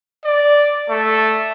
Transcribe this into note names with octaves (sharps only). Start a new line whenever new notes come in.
D5
A3